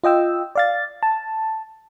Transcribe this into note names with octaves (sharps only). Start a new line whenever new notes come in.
F4 D#5 G5 E6
D5 F5 A6
A5